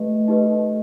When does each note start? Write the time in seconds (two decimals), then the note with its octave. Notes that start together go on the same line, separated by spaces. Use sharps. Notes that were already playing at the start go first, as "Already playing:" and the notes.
Already playing: A3 G4 B4 D#5
0.28 D#4 G4 B4 D#5